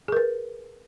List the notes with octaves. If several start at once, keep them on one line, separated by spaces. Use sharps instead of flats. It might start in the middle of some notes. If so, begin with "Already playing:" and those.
G#4 A#4 B4